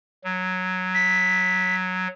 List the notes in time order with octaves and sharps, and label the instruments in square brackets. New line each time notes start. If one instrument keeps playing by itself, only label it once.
[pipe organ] F#3
[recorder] B6